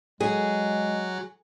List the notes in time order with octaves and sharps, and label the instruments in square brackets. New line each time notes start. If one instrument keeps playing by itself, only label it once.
[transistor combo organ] F#3 [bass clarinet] G#3 [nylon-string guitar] G#4